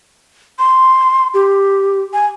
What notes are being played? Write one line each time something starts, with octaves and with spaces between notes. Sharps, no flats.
C6
G4
G#5